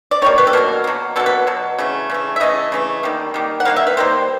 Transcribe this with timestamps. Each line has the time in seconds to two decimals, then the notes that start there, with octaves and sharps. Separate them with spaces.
0.11 D5
0.22 D#3 G3 A#3 C#5
0.38 B4
0.47 A4
0.53 B2 F#3 A#3 A#4
0.84 B2 F#3 A#3
1.16 B2 F#3 A#3 A4
1.26 B4
1.47 B2 F#3
1.78 C#3 E3 A3
2.10 C#3 E3 A3
2.36 E5
2.40 C#3 E3 A3 D#5
2.72 C#3 E3 A3
3.03 D#3 G3 A#3
3.34 D#3 G3 A#3
3.60 F#5
3.65 D#3 G3 A#3 F5
3.76 E5
3.87 B4
3.97 D#3 G3 A#3 C5